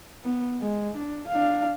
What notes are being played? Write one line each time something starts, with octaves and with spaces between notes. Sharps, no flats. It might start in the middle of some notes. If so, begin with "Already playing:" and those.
B3
G#3
D4
D4 F5